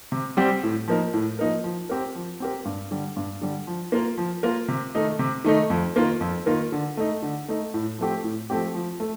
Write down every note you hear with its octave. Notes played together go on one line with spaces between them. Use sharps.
C3
G3 C4 G4
A2
F3 A#3 D#4 A#4
A2
F3 A#3 D#4 A#4
F3
C4 G4 A#4
F3
C4 G4 A#4
G2
D3 G3
G2
D3 G3
F3
A#3 F4 A#4
F3
A#3 F4 A#4
C3
D#3 A3 D#4
C3
D#3 A3 D#4
F2
D#3 A#3 F4 A#4
F2
D#3 A#3 F4 A#4
D3
A3 D#4
D3
A3 D#4
A2
F3 A3 C4 G4
A2
F3 A3 C4 G4
F3
A3